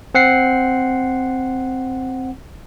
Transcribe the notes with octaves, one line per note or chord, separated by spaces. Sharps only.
C4 F#5 C7